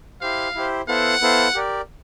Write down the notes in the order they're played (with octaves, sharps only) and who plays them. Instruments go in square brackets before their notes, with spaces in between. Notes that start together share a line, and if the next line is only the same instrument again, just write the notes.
[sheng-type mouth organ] E4 G4 C5 [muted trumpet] F5
[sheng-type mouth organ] E4 G4 C5
[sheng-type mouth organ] B3 E4 A4 C5 F5 [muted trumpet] F#5
[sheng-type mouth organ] B3 E4 A4 C5 F5
G4 A#4 D5